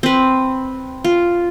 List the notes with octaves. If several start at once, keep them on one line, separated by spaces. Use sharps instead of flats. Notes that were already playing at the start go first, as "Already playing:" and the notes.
C4 B4
F4